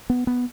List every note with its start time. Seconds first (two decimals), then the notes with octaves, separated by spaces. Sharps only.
0.10 B3
0.27 B3